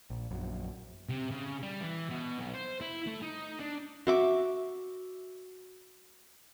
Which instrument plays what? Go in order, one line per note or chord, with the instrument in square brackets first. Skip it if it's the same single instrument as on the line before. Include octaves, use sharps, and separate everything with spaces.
[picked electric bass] A#1
A#1 F#2
[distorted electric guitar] C3
C#3
G3
E3
B2
B1
C5
E4
A3
D#4
D4
[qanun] F#4 E5 D6